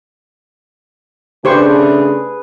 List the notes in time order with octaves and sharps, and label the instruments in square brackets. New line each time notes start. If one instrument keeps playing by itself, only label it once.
[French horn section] C#3 A3 D4 [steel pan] G4 C5 C#6 [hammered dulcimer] G#4 B4